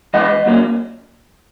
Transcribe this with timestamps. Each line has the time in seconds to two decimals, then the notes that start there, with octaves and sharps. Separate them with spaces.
0.14 E3 G#3 B3 D#5 F#5
0.46 A#2 F#3 A#3 C#4